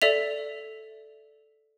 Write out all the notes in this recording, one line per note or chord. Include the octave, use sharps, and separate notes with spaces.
A4 D5 E5 F7